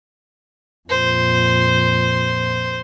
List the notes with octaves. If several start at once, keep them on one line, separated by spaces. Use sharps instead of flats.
F2 A#2 C5